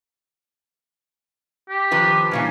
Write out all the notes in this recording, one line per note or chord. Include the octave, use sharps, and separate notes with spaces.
G4
D#3 F3 B4
G2 A#2 E3 C#4